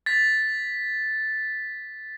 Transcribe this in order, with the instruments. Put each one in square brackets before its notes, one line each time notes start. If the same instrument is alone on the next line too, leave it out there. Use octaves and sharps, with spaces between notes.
[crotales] A6 B6